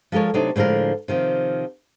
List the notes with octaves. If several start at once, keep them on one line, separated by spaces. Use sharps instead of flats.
F3 G#3 A4 A#4 C#5
C3 F#3 A3 C4 D4 D#4
A2 D3 F3 G#3 A#4
C3 D#3 F3